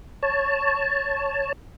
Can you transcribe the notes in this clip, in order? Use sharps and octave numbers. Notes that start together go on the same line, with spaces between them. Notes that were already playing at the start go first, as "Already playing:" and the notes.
C#5 A5